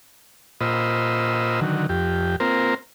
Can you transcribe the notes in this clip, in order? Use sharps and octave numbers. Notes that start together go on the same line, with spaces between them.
A#2 F4 C5 D#5 B5 E6
D3 D#3 F#3
F2 G4
A#3 C4 F4 A#4 C5